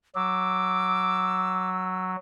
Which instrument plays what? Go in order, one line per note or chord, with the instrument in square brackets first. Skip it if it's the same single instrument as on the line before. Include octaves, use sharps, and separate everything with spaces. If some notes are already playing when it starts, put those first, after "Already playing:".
[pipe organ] F#3 [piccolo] D6 [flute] E6